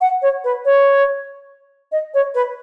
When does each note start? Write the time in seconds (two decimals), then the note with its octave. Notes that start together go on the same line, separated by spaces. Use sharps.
0.01 F#5
0.22 C#5
0.44 B4
0.65 C#5
1.92 D#5
2.14 C#5
2.35 B4